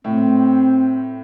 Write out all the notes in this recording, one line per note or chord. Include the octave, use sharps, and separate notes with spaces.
A2 C4